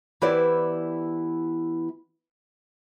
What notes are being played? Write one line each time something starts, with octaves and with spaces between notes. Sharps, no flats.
E3 B3 E4 G4 C5 D5